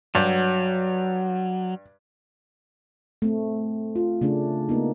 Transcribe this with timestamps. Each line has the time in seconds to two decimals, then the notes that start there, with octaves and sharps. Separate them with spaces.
0.15 G2 F#3
3.22 A3 C4
3.96 F4
4.21 C#3 A3 C#4 D4
4.69 A#3 B3 D#4